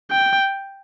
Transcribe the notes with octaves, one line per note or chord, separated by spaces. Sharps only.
G5